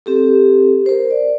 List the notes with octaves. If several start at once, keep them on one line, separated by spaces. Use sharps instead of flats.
C4 G4 A4
A#4 C5
D5